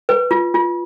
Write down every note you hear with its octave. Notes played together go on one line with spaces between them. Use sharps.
B4
F4
F4